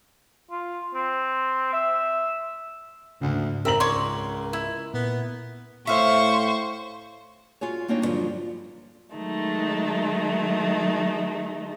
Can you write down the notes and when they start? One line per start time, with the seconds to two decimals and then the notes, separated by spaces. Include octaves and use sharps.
0.51 F4
0.95 C4
1.73 E5
3.21 D2 G#2 C#3
3.65 C4 A#4 E5 A#5 F#7
3.80 C#2 C#5 D5 C6
4.53 E4
4.94 A#2 B3
5.87 A2 C5 E5 F5 C#6
7.61 F4 F#4 G#4 C#5
7.88 G3 A#3 C4 D4 D#4 C#5
8.02 E2 G2 D3 F3 F#3
9.15 D#3 F#3 G#3 A3 D#4